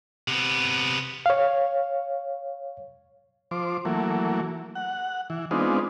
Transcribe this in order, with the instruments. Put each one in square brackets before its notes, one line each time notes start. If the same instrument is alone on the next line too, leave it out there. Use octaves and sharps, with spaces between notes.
[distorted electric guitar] C3 B3
[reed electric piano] C#5 F5
[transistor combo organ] F3 C5 D6
E3 F#3 A3 A#3
F#5
E3
G#3 B3 C4 D4 D#4 F4